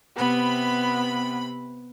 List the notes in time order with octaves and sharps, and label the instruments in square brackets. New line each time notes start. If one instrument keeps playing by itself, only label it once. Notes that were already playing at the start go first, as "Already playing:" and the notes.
[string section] C3 B5 [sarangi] B3